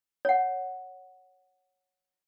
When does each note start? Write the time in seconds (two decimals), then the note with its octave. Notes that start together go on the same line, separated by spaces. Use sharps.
0.25 C#5 F#5